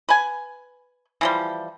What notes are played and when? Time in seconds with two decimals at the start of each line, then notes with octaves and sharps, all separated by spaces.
0.09 B4 G#5
1.21 E3 F3 G3